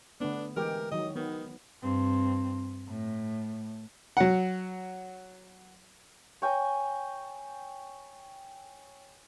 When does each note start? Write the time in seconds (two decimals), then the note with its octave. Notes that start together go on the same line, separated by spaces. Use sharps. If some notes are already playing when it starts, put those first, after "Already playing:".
0.20 D3 A3 B3 D4
0.56 E3 G#3 G4 A#4
0.92 D#3 F#3 D#5
1.16 D#3 B3
1.83 G2 C4
2.88 A2
4.17 F#3 F#5
6.42 C#5 G5 G#5 A#5